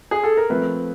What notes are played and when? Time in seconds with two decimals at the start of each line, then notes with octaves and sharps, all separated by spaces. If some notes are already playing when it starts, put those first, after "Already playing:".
0.11 G#4
0.24 A4
0.37 A#4
0.50 F3 A3 C4 B4